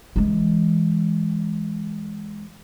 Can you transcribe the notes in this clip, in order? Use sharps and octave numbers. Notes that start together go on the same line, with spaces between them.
E3 G#3